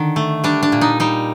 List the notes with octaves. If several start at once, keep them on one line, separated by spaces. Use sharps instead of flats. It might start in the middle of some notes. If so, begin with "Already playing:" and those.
Already playing: D3 D#3
A3
G3 D4
D4
A#2
D#4
G3 D#4